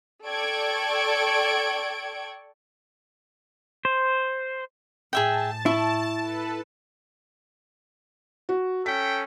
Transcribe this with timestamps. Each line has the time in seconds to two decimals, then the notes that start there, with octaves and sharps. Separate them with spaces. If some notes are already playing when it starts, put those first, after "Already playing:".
0.25 A4 D5 G5 C#6 G#6 D7
3.85 C5
5.13 A2 G#4 E5 G5 A5
5.66 E4 C#6
6.20 A4 B4
8.49 F#4
8.86 C#4 A4 G5 B6